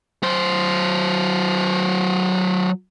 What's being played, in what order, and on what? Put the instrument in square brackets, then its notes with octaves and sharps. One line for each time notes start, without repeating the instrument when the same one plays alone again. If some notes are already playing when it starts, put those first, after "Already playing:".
[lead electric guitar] F#3 C5